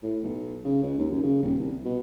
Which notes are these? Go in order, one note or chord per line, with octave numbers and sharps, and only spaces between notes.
A2
B1
C#3
C#2
D#2
F#2
C#3
D#1
C2
B2